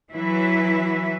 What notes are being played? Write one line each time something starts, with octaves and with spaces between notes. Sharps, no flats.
E3 F#3 E4 B4 E5